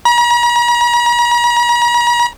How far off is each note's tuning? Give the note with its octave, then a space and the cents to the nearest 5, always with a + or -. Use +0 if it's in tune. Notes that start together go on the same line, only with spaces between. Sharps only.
A#5 +45